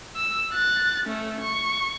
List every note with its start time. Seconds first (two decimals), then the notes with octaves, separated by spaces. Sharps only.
0.16 E6
0.53 F#6 A6
1.06 A3 C#4
1.41 C#6